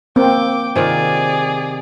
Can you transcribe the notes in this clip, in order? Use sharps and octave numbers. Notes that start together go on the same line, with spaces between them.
A#3 C4 G5 D6
C3 D#3 F4 G#4 D5